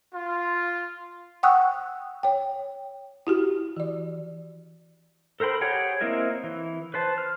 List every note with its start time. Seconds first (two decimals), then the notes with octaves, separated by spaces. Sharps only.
0.13 F4
1.43 F#5 G5 C#6 D#6 E6 F#6
2.23 C#5 G5
3.27 E4 F#4 G4
3.77 E3 D5
5.40 A4 A#4 C5 G5 B5
5.61 G4 G#4 C#5 F#5 G5
6.01 A#3 C4 E4 A#4 D#5
6.44 E3
6.94 B4 C5 A5
7.18 F6